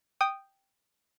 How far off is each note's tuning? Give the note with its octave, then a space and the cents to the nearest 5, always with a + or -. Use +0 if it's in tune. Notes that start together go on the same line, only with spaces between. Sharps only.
G5 +0 D#6 -10